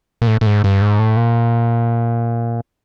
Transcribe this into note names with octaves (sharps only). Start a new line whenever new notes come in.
A#2
A2
A2
G#2
G2
G#2
A2
A#2